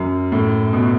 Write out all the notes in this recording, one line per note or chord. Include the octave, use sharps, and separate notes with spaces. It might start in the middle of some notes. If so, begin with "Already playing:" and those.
Already playing: F#2
A2
B2